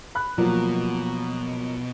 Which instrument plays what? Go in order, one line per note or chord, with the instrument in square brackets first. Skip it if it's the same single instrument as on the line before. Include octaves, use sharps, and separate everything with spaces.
[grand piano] B5 F#6
[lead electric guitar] B2 [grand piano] F3 F#3 A#3